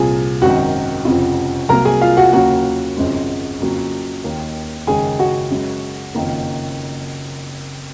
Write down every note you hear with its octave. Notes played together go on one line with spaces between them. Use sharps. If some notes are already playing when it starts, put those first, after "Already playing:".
Already playing: C2 A#2 F3 G#4 G#5
G#1 F#2 D#3 F#4 F#5
F1 F2 C#3 F3
C2 C3 F#3 A#3 A#4 A#5
G#4 G#5
F4 F5
F#4 F#5
D#2 C#3 F#3 A#3 F#4 F#5
G#1 F#2 C#3 F3 G#3
F2 C#3 F#3 A#3
D#2 D#3 A#3
F#1 F#2 D#3 G#3 G#4 G#5
F#4 F#5
F#2 C#3 G#3
F#1 F2 D#3 A#3